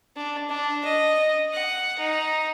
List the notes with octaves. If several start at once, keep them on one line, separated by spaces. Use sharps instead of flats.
D4
D4
D#5
F#5
D#4